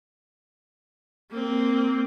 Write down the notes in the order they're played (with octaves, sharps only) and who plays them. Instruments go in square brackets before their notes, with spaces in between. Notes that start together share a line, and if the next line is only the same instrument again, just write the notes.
[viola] A#3 C4